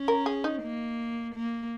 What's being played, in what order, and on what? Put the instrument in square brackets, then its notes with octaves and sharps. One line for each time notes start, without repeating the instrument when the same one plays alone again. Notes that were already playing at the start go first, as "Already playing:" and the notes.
Already playing: [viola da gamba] C#4
[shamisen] A#4
G#4
D#4
[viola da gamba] A#3
A#3